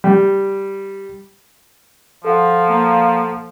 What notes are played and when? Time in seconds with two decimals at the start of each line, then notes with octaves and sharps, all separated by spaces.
0.04 G3
2.25 F3 A4 F5 F#5
2.69 A#3